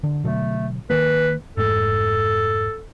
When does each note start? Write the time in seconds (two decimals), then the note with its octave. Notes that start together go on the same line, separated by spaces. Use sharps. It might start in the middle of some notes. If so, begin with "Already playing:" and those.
0.03 D3
0.24 B2 D3 F#3 A3
0.90 D#3 A#3 B4
1.57 F1 G#2 A4